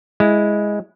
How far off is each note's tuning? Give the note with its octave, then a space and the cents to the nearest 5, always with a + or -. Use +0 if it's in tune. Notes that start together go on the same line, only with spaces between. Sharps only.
G#3 +0 E4 +0